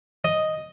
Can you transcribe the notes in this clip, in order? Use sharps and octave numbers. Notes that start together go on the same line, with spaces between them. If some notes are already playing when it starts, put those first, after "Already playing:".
D#5